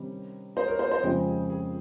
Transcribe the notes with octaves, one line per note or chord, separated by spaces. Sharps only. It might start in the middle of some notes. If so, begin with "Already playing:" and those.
Already playing: C3 D#3 G3 C#4
C5 D#5
A#4 C#5
G#4 C5
C5 D#5
F2 C#3 G#3 C4 D#5 G5
G#4
G#4